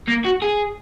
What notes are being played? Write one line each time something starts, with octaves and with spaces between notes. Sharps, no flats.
A#3
F#4
G#4